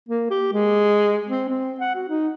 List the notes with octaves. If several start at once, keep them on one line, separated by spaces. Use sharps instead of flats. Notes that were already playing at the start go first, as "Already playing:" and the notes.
A#3
G4
G#3
C4
C4
F#5
F#4
D#4